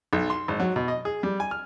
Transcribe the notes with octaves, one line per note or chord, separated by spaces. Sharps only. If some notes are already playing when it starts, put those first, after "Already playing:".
B1
C6
G#1
F#3
B2
D#5
G#4
G3
G#5
F6